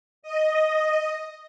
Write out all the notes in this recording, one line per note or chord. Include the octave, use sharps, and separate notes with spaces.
D#5